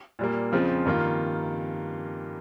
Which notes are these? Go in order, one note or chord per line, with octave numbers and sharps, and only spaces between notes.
A#2 G3 A#3
F2 C#3 F3 C4 F4
G2 D#3 A#3 F4